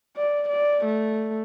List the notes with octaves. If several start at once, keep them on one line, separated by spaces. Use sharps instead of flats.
D5
D5
A3